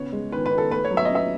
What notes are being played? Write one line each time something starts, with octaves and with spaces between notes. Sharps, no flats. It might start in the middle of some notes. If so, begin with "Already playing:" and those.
Already playing: C#3 B3 C#5
G#3
D#3 B4
B4
D#3
A4
A3 B4
C#5
F#3
E5
D#5
C#4
E5